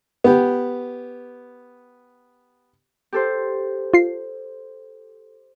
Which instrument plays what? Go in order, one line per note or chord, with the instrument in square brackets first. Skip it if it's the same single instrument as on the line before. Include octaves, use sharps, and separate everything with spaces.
[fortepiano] B3 G4
[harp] G4 A4 C5
[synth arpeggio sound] F4 C7